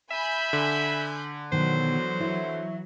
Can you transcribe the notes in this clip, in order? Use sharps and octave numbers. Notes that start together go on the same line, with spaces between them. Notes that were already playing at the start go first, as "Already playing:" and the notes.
E5 G#5 B5 G6
D3
B2 D#3 E3 F#3 C5
E4 C#5